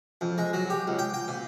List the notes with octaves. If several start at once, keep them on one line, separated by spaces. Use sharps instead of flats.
F2
G#3
F#3
G4
C#2
G5
G5
A#2